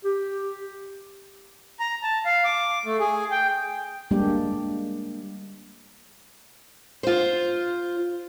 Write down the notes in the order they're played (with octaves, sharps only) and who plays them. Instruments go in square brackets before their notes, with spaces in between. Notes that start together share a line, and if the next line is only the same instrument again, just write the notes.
[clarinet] G4
[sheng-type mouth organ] A#5
A5
F5
D6
A3
G#4
G5
[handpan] G3 G#3 A#3 D4 G4
[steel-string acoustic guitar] F4 C5